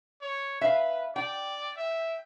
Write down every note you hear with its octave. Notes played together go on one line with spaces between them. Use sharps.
C#5
B4 E5 F5
D5 G5
E5